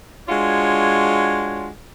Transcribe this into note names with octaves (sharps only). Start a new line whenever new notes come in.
G#3 D4 F4 F#4 C#5